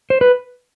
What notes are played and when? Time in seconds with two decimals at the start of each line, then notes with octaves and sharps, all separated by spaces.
0.10 C5
0.21 B4